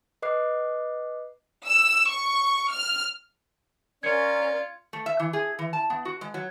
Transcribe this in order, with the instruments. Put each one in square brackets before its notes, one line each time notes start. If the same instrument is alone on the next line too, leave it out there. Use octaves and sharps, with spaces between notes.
[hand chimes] B4 D#5 D6 F#6 C7
[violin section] E6
C#6
F6
[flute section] C#4 A#4 [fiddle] F4 [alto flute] D5 [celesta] G#6 C#7
[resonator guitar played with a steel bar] A3
E5
E3
G#4
E3
A5
B3
F#4
G#3
F#3